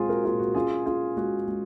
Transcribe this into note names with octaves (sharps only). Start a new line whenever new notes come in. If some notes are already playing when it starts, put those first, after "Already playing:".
Already playing: A#2 G#3 C4 F4 G#4
F#4 A#4
A#2 F4 G#4
F#4
C#4 F4 G#4
C#4 F4 G#4
G#3 F#4
G#3